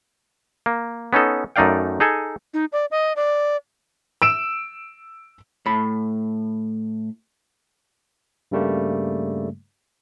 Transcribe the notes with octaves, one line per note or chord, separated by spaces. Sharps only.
A#3
B3 C#4 D#4 A4
F#2 A3 D#4 D5 F5 G5
D#4 G#4 A4 G#5
D#4
D5
D#5
D5
E6 D7 E7
A2 B5
G2 C#3 G3 A3 A#3